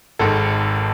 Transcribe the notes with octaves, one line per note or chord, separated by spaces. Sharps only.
G#1 G#2 D#3 A4